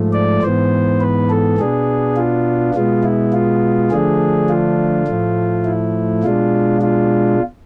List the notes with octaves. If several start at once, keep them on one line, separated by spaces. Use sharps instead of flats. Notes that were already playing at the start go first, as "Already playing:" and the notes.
Already playing: G#2 F3 A3
D5
G#2 E3 B3 C5
B4
A4
B2 B3 D4 G#4
F4
B2 G#3 B3 F4
E4
F4
D3 F3 A3 D4 G#4
F4
A2 F3 A3
E4
B2 G#3 D4 F4
F4